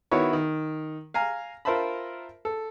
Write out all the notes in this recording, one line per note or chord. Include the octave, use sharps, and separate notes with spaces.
D#3 B3 E4 F#4 B4 C#5
D#3
F5 G#5 A#5
F4 A#4 C5 E5 A5 B5
A4